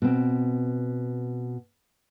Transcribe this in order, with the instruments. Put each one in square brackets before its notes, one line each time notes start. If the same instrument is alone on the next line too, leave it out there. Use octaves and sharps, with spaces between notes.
[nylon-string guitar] B2 C4